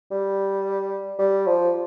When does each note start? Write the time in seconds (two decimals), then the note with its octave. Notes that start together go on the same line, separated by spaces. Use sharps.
0.11 G3
1.19 G3
1.47 F3